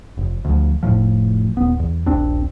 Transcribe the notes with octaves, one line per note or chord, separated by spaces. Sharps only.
F1
D2 F3
F1 C2 A2 F3
D#1 B3
E2
D#1 A#1 C4 D4